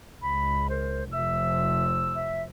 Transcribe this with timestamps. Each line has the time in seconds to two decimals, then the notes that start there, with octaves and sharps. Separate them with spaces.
0.22 C#2 B5
0.70 A#4 C5
1.13 F1 F3 E5 E6
2.15 E5